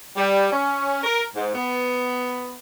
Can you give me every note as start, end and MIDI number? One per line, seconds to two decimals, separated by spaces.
0.16 0.47 55
0.52 1.02 61
1.03 1.24 70
1.35 1.51 44
1.55 2.54 59